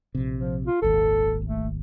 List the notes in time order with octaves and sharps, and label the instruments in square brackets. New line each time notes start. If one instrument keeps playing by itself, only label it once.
[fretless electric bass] A#1 C3
[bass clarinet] F3
F4
[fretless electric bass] D#1 G#1 D#2 [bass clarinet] A4
[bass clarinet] A3